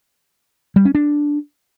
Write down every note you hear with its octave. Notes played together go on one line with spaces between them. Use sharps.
G3
C#4
D4